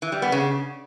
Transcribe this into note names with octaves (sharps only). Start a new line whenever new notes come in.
E3
G3
B3
C#3